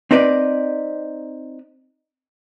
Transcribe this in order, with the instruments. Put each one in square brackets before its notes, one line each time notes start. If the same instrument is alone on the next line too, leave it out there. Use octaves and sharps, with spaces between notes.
[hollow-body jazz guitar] C4 D#4 B4 D5